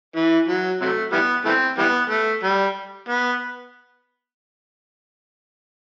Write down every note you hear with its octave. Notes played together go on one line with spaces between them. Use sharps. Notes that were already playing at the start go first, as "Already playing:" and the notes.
E3
F#3
C3 F#3 A3
E3 G3 B3
E3 A3 C4
E3 G3 B3
A3
G3
B3